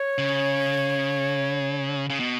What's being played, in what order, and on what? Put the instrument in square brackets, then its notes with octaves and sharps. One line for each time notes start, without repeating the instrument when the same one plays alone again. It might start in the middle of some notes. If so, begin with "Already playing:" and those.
Already playing: [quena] C#5
[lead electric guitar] C#3
C#3
B2